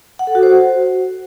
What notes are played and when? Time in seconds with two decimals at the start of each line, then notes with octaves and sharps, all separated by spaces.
0.19 F#5
0.27 A4
0.35 F#4
0.43 C5